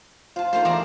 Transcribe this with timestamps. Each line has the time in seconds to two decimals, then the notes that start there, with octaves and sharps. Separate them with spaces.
0.36 F4 C5 A5
0.53 A3 A#3 D#4 C5
0.65 E2 G#4 D5 E5 A#5